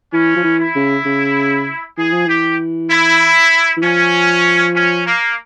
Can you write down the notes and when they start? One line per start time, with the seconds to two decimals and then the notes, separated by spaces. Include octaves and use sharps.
0.13 E3 C#4
0.36 F3
0.44 E3
0.60 E4
0.75 C#3
1.05 C#3
1.98 E3 G#4
2.12 F3
2.26 E3 G4
2.91 E4
3.77 E3
3.83 F3 C#4
4.75 C#4
5.06 A#3